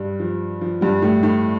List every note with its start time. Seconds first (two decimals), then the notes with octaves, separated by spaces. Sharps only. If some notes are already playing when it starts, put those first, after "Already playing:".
Already playing: G2 G3
0.20 F3
0.61 F3
0.81 G2 G3
1.02 A2 A3
1.23 A2 A3